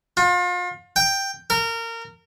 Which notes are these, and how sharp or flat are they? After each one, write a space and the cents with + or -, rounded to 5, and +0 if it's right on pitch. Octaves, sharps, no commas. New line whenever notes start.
F4 +35
G5 +5
A#4 -25